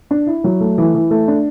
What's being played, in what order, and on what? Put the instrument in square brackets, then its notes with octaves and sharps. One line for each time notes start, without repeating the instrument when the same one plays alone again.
[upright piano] D4
E4
F#3
A3
E3
E3
A3
D4